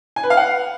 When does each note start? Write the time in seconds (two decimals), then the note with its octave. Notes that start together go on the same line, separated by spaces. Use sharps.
0.16 G#5
0.23 B4
0.30 F5
0.37 F#5